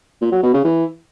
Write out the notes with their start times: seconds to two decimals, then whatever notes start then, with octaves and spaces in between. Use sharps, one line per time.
0.21 A#2
0.32 F#3
0.43 B2
0.53 C#3
0.64 E3